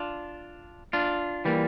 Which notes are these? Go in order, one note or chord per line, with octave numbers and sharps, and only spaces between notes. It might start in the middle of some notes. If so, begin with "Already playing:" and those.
Already playing: D4 F4
D4 F4
E3 G3 A#3